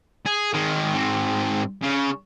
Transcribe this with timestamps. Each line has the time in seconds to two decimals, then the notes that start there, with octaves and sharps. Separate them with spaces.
0.26 G#4
0.53 D#3 G#3
0.94 G#2 C4
1.82 C#3